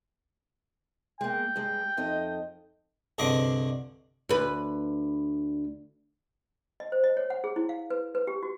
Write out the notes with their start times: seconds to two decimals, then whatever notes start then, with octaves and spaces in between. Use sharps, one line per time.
1.21 G#3 A#3 G5
1.56 G2 G#3
1.97 F2 D#4 D#5
3.18 C2 G2 D3 G#4 D#5 D6
4.29 D2 B4
6.80 D#5
6.92 C5
7.04 D#5
7.17 C#5
7.30 F#5
7.44 G#4
7.56 E4
7.69 F5
7.90 B4
8.15 B4
8.27 G4
8.43 F#4